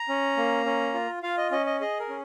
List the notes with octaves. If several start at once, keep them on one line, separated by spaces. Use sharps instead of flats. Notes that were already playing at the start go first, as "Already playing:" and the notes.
Already playing: A#5
C#4
A#3
C#4
F4
F4 F5
D#5
C#4 D#5
D#5
G#4 D#5
A#4
C#4